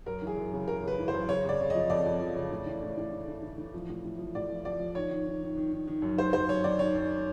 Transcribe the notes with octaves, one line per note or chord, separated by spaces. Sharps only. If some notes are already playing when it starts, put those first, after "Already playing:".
F#2 A#4
E3 G#4
F#2
C#3
F#2 A#4
C#3
B4
E3
C5
F#2
C#3 C#5
C#3 D5
C#3
F3 D#5
F2 D5
F2
F3
C#3
A2
E3
A2
A2
A2
E3
E3
E3
F3
A2
A2
F3
A2 D5
F3
F3 D5
F3
D#3 C#5
D#3
D#3
D#3
D#3
D#3
D#3
F#2
D#3 C5
F#2 C5
F#2 C#5
D#3 D5
D#3 C#5
F#2